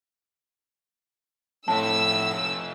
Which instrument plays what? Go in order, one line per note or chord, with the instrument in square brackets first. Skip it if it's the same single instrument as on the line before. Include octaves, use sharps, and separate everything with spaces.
[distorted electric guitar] F2 E5 [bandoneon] A2 [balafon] A5 [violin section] E6